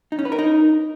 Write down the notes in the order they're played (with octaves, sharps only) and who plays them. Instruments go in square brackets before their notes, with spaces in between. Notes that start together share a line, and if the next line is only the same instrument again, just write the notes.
[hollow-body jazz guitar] D#4
C#4
B4
A#4
D#4